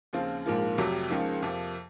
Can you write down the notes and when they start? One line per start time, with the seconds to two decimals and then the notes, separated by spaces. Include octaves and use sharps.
0.13 D#2 C#3 F3 C4 F4
0.46 A#1 G#2 F3 A#3 F4
0.78 F1 F2 C3 F#3
1.10 C#2 C#3 F3 A#3 D#4
1.42 F2 C3 F3 A#3